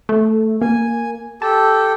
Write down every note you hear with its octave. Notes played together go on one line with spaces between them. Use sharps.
A3
A#3 G#5
G4 A4 A5